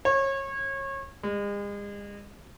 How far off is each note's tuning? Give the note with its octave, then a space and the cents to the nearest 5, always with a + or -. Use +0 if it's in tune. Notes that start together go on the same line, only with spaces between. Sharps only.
C#5 -30
G#3 -40